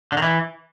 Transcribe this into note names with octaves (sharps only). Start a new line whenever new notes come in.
D3
D#3
E3